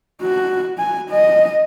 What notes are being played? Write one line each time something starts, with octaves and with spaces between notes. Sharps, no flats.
F#4
G#5
D#5